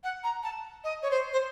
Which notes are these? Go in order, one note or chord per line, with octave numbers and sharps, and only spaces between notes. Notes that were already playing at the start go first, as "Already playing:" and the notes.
F#5
A#5
A5
D#5
C#5
C5
C5